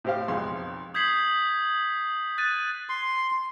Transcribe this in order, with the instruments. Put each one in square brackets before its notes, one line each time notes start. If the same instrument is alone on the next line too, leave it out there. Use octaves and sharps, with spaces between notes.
[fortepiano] A2 C4 G4 C5 F5
B1 F2 G#3 C6
[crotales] D#6 G6 G#6 B6 C7 F#7
F#6 A6 D#7
[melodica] C6